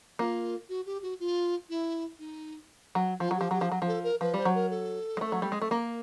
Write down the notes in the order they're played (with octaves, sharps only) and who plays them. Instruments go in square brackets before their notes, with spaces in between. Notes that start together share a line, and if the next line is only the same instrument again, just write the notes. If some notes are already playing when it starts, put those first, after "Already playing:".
[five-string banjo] A#3 [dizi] F4
[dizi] F#4
G4
F#4
F4
E4
D#4
[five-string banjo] F#3
[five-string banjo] F3 [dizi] F4
[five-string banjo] F#3
[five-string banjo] F3 [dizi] G4
[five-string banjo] F#3 [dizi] G4
[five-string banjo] F3
F#3
F3
[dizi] A4
A#4
[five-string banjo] F3 [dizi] B4
[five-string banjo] G3 [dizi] C5
[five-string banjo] F#3
[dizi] A#4
A4
[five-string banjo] G#3
A3
F#3
G3
G#3
A3
A#3